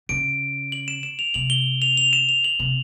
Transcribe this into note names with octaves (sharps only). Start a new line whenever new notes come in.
C#3 D7
F#7
E7
E7
F7
C3 F#7
G7
F7
F7
E7
F7
F#7
C3